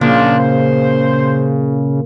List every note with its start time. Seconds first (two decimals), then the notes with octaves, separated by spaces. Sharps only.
0.01 A#2 C#3 F3 D4
0.39 C5